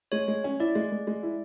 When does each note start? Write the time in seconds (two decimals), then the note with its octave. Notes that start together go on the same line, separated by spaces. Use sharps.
0.12 G#3 C#5
0.28 G#3
0.44 C#4
0.60 E4 D5
0.75 G#3
0.92 G#3
1.07 G#3
1.23 E4